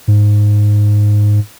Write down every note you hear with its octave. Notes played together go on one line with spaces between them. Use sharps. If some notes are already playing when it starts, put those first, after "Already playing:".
G#2